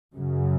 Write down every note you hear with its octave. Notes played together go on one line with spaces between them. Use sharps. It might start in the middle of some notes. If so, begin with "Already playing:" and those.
F#2 C#3